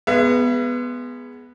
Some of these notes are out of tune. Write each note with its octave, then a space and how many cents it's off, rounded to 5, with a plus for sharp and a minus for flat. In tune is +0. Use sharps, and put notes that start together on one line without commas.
G#3 +0 B3 +0 E5 +45